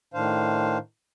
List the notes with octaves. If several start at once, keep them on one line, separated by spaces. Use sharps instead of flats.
A2 D#3 D4 C5 F5